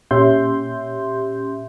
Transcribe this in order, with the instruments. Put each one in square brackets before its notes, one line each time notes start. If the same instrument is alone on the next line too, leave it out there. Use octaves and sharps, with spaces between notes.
[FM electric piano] A#2 C#4 G4 E5 C6 G6